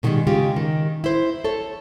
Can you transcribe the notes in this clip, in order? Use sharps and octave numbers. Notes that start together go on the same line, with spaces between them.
B2 D3 D#3 G3 G#3
C#3 G#3 F4 G4
D#3
E4 C5
A4 C#5